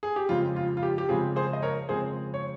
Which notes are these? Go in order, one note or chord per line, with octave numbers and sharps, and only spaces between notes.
G#4
G4
F2 C#3 G#3 C4 F4
F4
F4
G4
G4
F2 C#3 G#3 C4 F4 G#4
G#4 C5
D#5
A#4 C#5
F2 C#3 G#3 C4 G#4 C5
C#5